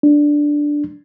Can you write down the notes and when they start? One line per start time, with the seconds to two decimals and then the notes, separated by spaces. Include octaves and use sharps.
0.03 D4